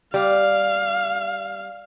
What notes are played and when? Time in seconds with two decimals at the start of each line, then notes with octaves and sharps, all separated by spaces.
0.14 G3 F5